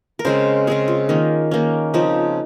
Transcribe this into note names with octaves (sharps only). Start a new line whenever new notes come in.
A#4
C#3 G#3 C4 C5
C#3 G#3 C4 G#4
F4
D#3 A#3 C#4
D#3 A#3 C#4
C#3 F3 C4 D#4